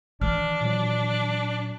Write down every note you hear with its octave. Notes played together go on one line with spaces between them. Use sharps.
D#3 E3 D4 F6
A#2 F#3